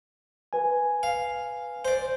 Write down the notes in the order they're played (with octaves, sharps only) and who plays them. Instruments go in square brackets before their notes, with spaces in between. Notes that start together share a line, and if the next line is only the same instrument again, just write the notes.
[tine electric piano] B4 G#5
[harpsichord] F5
C5 D5